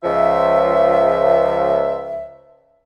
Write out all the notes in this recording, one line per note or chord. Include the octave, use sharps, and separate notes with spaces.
C#2 F3 E5